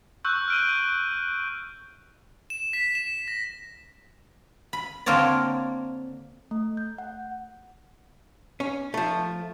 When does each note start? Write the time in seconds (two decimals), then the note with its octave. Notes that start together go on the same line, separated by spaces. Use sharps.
0.25 C#6 E6 F#6 G6
0.48 F6 D7 D#7
2.50 E7
2.73 B6
2.95 E7
3.28 A#6
4.73 B5
5.06 D3 A#3 C4 A#4 C#5 D5
6.51 A3
6.77 G6
6.98 F#5
8.60 C#4
8.94 F3 A3